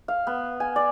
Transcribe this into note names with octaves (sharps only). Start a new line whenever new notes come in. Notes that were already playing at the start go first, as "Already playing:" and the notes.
F5
B3
G#5
D5